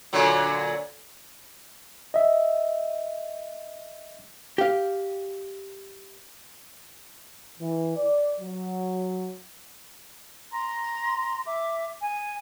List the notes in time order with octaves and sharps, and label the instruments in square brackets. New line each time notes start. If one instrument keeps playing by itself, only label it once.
[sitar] A#2 D3 F#3
[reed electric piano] D#5 E5
[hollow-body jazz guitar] G4 F5
[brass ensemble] E3
D5
F#3
[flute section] A#5 C6
E5 D6
G#5